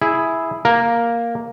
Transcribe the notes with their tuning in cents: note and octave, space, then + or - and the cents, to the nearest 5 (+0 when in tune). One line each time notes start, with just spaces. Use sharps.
E4 +0 G#4 +0
A#3 +0 A#4 +0